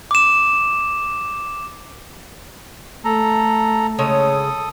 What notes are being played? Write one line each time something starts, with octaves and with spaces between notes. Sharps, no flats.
D6 E7
A3 A4 A#5
C#3 G#3 A4 C#5 D#6